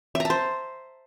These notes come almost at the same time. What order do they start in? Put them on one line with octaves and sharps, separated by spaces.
E5 A#5 A5 C5